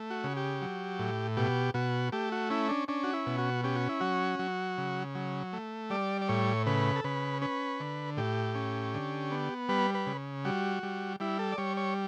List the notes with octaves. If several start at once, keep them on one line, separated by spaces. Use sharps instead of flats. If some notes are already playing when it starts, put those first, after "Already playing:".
Already playing: A3
F#4
C#3
G4
F#3
A2
B2 G4
B2 F#4
A3 G4
F#4
C#4 E4
D4
C#4 D4
F#4
E4
B2
F#4
C#4 G4
F#4
E4
F#3 F#4
F#3
C#3
F#3
A3
G3 D5
D5
A2 C#5
C#3 B4
A4
C#3 B4
C#4 B4
D3
A2 G4
C#4
D3
B3
G3 B4
B4
C#3
G3 F#4
G3
G3 E4
A4
D5
G3 C#5
C#5